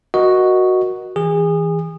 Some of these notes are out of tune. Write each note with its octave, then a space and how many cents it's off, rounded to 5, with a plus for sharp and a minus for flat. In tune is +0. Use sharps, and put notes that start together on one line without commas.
F#4 +0 A#4 +25 D#5 +0
E3 -25 G#4 -30